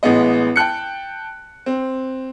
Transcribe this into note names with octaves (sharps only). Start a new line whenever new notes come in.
A1 G#3 B3 D#5
G5 A5 F#6 C#7
C4